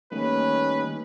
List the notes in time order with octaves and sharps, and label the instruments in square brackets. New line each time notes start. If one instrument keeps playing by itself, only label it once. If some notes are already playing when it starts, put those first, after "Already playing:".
[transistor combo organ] D#3 G3 D#4 [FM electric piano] A3 A#3 [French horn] C#4 [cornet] B4